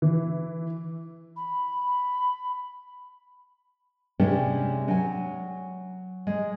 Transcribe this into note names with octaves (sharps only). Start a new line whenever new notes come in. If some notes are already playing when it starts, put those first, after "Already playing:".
E3
B5
C3 G#3 C#4 D4
F#3 G#5
G#3